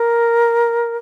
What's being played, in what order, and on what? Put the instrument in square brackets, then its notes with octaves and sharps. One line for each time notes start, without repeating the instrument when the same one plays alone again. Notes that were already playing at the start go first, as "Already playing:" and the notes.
Already playing: [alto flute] A#4